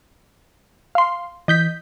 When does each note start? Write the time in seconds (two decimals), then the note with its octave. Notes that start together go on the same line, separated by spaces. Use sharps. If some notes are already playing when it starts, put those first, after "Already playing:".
0.95 F5 C6
1.48 E3 D#5 G6 B6